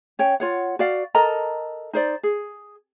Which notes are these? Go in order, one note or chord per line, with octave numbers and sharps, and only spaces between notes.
C#4 C#5 G5
F4 C#5 F#5
F#4 D5 F5
A4 A#4 D#5 A#5
D#4 C5 D5
G#4